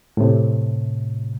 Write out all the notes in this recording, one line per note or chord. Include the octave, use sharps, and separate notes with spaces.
A2 C3